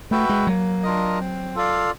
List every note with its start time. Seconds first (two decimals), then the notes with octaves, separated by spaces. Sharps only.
0.11 A3 F#4 B4 E5 G5
0.29 G#3
0.47 F#3 A#3
0.83 D4 F4 A#4 D#5
1.19 C4
1.55 F4 A4 D5 F5